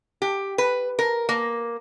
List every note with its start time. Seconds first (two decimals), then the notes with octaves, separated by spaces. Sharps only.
0.22 G4
0.58 B4
0.99 A#4
1.29 A#3